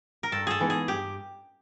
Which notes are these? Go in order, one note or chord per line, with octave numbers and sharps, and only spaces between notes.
A#4
G2 A4
G#4 A4
E3 G#3 B3 D#4
G#4
G2 G4